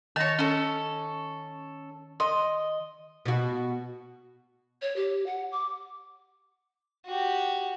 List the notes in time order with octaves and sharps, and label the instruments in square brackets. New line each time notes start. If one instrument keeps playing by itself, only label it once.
[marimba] D#3 A#6 [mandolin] C#5 A5
[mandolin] C#4 A4
[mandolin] D#5 [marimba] C6
[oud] B2 F#4
[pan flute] C#5
G4
F#5
D6
[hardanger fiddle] F#4 G4